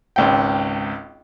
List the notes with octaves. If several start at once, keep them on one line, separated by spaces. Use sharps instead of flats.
G#1 C#2 G5